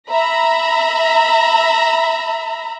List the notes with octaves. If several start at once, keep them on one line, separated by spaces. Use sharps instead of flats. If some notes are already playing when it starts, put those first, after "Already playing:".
E5 A#5 B5